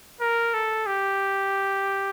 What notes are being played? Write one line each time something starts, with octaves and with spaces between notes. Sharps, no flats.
A#4
A4
G4